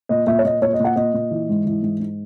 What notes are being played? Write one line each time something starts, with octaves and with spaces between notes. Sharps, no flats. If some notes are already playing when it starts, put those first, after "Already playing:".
A#2 D#5
A#2 E5
C#5
A#2 D#5
A#2 C#5
D#5
A#2 F#5
A#2 D#5
A#2
E3
G#2
E3
G#2
G#2